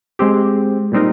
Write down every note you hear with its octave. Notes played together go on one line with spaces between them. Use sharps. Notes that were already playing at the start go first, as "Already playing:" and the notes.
G#3 C4 G4
A#2 G3 C4 D#4 A#4